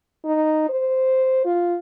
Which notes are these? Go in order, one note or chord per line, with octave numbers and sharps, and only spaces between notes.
D#4
C5
F4